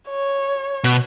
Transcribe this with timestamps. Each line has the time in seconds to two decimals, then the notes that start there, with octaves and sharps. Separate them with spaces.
0.09 C#5
0.84 B2